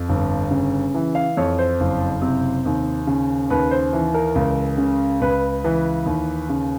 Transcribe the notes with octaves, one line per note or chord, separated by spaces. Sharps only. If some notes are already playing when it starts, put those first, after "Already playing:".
Already playing: F2
G1
C#3
E3
F5
F2 C#5
C5
F#1
C3
D#2
C#3
D#2 B4
C5
E3
A#4
C#2
C#3
C#2 B4
E3
D#2
C#3